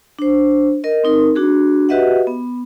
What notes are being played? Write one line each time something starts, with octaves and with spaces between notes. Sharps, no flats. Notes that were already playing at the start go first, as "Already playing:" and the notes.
D4 C5
A#4 D#5
C4 D#4 A#4
D4 F#4 G#4
F#4 G4 B4 D#5 E5 F#5
B3